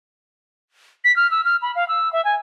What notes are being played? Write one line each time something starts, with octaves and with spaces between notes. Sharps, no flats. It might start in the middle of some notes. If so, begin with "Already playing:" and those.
B6
F6
E6
F6
B5
F5
E6
E5
G#5